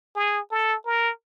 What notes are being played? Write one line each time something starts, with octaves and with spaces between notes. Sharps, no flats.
G#4
A4
A#4